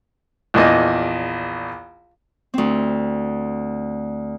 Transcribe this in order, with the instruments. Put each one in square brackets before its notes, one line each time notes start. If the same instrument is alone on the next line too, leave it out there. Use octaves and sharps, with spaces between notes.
[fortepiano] A#1 E2 D#5
[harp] D2 C4